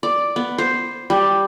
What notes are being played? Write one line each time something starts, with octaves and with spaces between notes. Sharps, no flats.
D5
B3
C5
G3